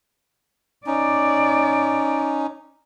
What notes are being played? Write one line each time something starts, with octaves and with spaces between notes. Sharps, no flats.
C#4 D#4 D5